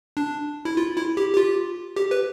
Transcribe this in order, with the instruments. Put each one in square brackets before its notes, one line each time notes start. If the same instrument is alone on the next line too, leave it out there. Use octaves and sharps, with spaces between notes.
[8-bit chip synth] D4
E4
F4
E4
G4
G4
F4
G4
B4